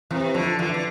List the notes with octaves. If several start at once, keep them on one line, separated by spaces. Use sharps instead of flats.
C3 E3
D3 F3
D3 E3
D3